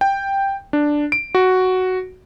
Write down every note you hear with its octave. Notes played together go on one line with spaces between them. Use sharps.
G5
D4
D7
F#4